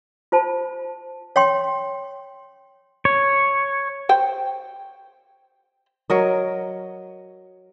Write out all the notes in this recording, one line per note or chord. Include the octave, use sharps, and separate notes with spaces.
F4 C5 A5 B5
C#5 G5 C6
C#5
C5 G5
F#3 A#4 D#5